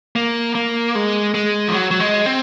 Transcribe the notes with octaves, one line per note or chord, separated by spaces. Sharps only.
A#3
A#3
G#3
G#3
F3
F#3
F#3
G#3
C4